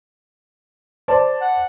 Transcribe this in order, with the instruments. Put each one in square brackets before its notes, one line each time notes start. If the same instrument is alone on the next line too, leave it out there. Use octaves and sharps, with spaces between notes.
[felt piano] C5 D5 A5
[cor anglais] F#5